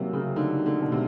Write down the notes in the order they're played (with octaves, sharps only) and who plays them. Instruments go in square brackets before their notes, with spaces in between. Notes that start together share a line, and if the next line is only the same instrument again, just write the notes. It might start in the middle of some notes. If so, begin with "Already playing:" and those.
Already playing: [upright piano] C3 D#3 E3 [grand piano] F#3 A#3
[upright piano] C#3
[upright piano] D3 [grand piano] D#4
[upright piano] D3
[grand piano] B2
[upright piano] C3